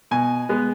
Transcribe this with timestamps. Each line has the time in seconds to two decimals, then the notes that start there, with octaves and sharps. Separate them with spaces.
0.11 B2 G#5
0.49 G#3 B3